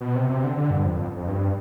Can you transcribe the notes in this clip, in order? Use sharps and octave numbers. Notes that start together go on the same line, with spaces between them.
B2
C3
C3
D3
D3
G2
F2
F2
F2
G2